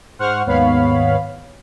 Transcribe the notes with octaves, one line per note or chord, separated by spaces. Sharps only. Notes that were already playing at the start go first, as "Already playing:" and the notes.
G#2 C5 F#5 C#6 F6
D#2 G#2 B3 C#5 F5 B5